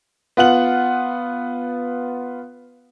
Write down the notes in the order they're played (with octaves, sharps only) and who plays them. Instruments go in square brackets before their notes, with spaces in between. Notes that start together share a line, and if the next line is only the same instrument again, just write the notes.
[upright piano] B3 F4 F#5 F#7